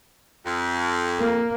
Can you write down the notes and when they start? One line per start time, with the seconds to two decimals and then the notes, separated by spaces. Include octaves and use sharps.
0.46 F2
1.21 A#3